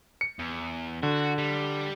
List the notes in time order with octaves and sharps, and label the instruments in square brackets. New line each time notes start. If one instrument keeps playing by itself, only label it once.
[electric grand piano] C#7
[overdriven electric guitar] E2
[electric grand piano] D3 [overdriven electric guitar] F#4
[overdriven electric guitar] G3